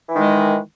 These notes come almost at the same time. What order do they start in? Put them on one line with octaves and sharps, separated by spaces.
E3 D#3 G#3